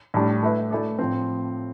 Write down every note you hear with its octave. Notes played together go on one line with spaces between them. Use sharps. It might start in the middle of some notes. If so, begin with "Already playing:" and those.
A2 G3 D4
A3 E4 B4 E5
A3 E4 A4 D5
A2 F3 C4